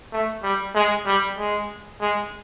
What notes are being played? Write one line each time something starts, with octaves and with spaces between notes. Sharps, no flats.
A3
G3
G#3
G3
G#3
G#3